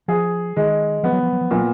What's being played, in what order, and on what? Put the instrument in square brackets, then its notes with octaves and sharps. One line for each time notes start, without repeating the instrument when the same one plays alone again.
[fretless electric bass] F3 [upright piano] G#4
[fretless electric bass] D#3 [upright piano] G#3
[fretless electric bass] F3 [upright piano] B3
[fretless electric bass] F#3
F3
F#3
F3
[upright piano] A#2 [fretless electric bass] F#3